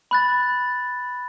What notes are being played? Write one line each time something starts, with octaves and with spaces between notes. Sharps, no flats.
B5 F#6 A6